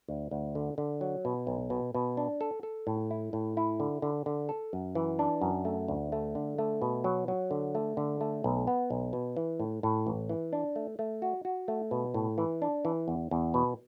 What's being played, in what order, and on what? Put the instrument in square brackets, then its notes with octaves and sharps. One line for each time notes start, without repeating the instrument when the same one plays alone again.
[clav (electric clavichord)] D2
D2
D3
D3
F#3
B2
B1
B2
B2
D4
A4
A4
A2
E4
A2
E4
D3
D3
D3
A4
F#2
E3
D4
F#2
A3
D2
A3
D3
A3
B2
F#3
F#3
D3
A3
D3
A3
B1
B3
B1
B2
E3
A2
A2
A1
E3
D4
A3
A3
F#4
F#4
A3
B2
A2
E3
D4
E3
E2
E2
B2